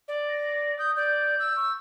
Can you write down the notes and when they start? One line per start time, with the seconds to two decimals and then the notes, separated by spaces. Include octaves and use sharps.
0.08 D5
0.29 A#6
0.79 D#6 G6
0.96 D5 G6
1.39 E6
1.56 C#6